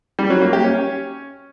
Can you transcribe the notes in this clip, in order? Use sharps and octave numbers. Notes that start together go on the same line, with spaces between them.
G3
F#3
A#3
G4
C#4